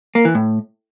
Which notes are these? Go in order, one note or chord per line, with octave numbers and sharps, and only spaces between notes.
A#3
E3
A2